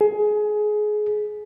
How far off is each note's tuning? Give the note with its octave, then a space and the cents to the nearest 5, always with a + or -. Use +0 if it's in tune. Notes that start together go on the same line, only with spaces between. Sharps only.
G#4 +20